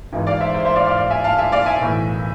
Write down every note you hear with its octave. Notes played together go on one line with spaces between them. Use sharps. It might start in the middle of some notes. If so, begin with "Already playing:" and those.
G#1 G#2 E3
D5 F5
C5 E5
C5 E5
C5 E5
D5 F5
D5 F5
D5 F5
E5 G#5
F5 A5
E5 G#5
D5 F5
E5 G#5
B1 A2 E3